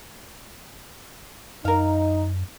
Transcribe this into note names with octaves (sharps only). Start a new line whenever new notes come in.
F#2 D#4 A#4 F5